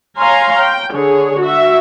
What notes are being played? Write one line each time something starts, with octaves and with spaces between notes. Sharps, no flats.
C#5 F5 G#5 A#5 C6
G5
D3 G#4 C#5
F#4 E5